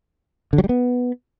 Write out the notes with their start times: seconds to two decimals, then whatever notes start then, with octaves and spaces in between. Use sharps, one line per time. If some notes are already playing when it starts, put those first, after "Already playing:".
0.53 D3
0.58 F#3
0.64 G3
0.69 B3